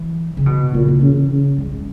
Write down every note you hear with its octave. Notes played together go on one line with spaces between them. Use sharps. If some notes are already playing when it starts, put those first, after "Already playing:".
Already playing: E3
C#3
B2
A#2 C#3
E3
C#3
C#3
G3
G#3